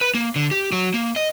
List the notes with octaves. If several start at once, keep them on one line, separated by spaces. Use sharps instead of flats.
B4
A#3
D3
G4
F#3
A#3
D#5